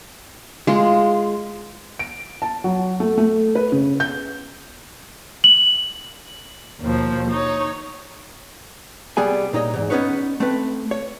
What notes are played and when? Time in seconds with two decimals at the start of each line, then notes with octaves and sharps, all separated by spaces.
0.67 G#3 F4
1.99 D7
2.42 A5
2.64 F#3
3.00 A3
3.18 A3
3.55 B4
3.72 C#3
4.00 G6
5.44 F#7
6.81 D#2 B2 F3
7.30 D#4 C#5
9.17 C2 G3 B3 G#4 G#5
9.53 A#2 D#4 C#5 D#5
9.74 E2 G#2
9.90 B3 C#4 D#4 B4 C#5
10.40 A3 C4 B4
10.91 C#5